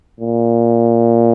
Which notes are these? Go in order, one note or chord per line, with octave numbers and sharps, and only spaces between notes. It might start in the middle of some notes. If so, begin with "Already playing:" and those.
A#2